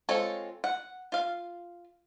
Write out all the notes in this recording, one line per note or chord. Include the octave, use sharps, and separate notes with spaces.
G#3 C4 F4 A4 C#5
F#5
F4 F5